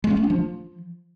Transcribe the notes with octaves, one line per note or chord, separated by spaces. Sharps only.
G#3
C#4
A3
D4
F3